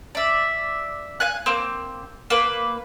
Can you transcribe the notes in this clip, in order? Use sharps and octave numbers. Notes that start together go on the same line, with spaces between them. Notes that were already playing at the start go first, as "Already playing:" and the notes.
D5 E5
F5 G#5 F#6
A#3 C4
A#3 B4